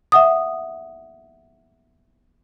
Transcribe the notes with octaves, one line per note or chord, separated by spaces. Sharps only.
E5 F#5 D#6